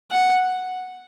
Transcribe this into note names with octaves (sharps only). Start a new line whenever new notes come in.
F#5